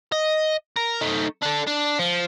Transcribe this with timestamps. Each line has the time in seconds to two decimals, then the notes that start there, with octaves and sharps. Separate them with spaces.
0.12 D#5
0.77 A#4
1.01 A3 D#4
1.42 D4 A4
1.67 D4
1.99 F3